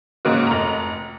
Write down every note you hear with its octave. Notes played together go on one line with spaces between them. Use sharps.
G#2 C#3 A#3 F#4
F1 A#5